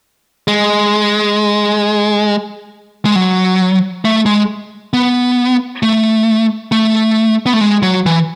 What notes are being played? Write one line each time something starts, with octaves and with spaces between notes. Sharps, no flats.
G#3
G#3
F#3
A3
G#3
B3
A3
A3
B3
A3
G#3
F#3
E3